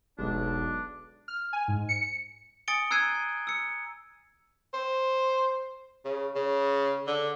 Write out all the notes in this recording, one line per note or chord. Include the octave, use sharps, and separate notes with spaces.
E1 B1 G#3 D4
F6
G#5
G#2
C#7
G#5 D#6 A6 C#7 D7 G7
A#5 E6 F#6 G#6 C7 D#7
E6 C#7
C5
C#3
C#3
D3